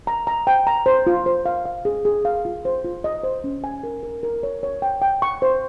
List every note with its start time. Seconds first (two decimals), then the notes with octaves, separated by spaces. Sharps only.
0.07 A#5
0.27 A#5
0.47 G5
0.67 A#5
0.86 C5
1.07 F4
1.26 C5
1.46 F5
1.66 F5
1.85 G#4
2.05 G#4
2.25 F5
2.45 F4
2.65 C5
2.84 F4
3.04 D#5
3.23 C5
3.44 C#4
3.64 G#5
3.84 A#4
4.03 A#4
4.23 A#4
4.43 C#5
4.63 C#5
4.82 G5
5.02 G5
5.22 C#6
5.42 C5